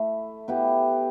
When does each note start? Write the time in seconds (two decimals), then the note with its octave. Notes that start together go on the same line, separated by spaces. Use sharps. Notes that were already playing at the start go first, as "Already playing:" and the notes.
Already playing: A3 E4 A4 E5
0.48 B3 E4 G4